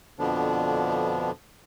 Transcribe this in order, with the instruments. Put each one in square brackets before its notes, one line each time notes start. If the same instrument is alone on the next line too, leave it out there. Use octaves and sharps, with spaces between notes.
[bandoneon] F2 B2 D3 F3 B3 D4